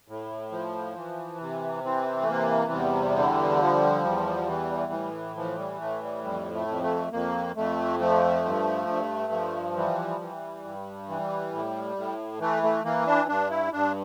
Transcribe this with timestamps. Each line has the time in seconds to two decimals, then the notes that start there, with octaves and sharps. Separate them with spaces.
0.08 A2
0.52 F3
0.96 E3
1.40 C3
1.84 E3 C4
2.22 A3
2.28 C3 A#3
2.72 E2 G3
3.16 D3
3.60 F3
4.04 E2
4.49 E3
4.92 A2
5.36 E3 F3
5.58 G3
5.80 A2 A3
6.02 G3
6.24 F2 G3
6.54 A3
6.68 F2
6.83 A3
7.12 F2 A#3
7.56 F2 A3
8.00 F3 A3
8.45 G2
8.88 G2
9.32 F3
9.76 E3 G3
10.21 E3
10.65 G2
11.08 E3
11.53 A2
11.96 A2
12.40 E3 A3
12.63 A3
12.84 E3 A#3
13.07 D4
13.28 G2 D4
13.50 E4
13.72 G2 D4